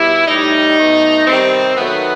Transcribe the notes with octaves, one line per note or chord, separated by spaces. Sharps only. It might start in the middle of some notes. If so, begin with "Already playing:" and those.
Already playing: B2 G3 E4
A2 G3 D#4
B2 A3
C3 D#3 G3 C4
D#3 F#3 A3 B3